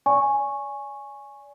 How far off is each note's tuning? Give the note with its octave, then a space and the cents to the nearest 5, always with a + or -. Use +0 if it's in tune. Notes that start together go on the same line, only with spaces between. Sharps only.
D5 -30 G#5 +0 C#6 -10